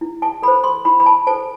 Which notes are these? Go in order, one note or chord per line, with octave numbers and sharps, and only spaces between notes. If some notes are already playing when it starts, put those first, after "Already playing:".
E4
A5
A4 B5
C5
C6
E4 B5
B5
A5
A4 C5 A5